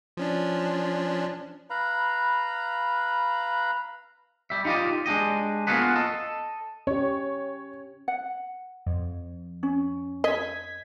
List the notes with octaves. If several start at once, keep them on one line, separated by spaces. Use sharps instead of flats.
F3 C#4 D4
B4 F5 A#5 B5
G3 E5
D#4 F4 G4 D5 D#5
G#3 D4 G4 D#5
A#3 B3 F4 F#4 G#4 B4
A4 D#5
C#4 G4 C#5
F#5
F2
C#4
D#5 G#6 B6